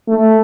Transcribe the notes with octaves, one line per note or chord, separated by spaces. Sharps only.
A3